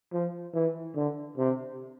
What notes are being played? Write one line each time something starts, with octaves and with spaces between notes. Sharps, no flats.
F3
E3
D3
C3